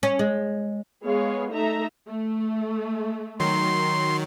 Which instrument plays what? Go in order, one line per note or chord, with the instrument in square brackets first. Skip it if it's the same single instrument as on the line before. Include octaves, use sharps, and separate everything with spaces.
[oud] C#4
G#3
[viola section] G#3 B3 G#4 C#5 F5
A3 D#4 A4 E5 A#5
A3
[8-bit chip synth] D#3 F#3 [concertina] C6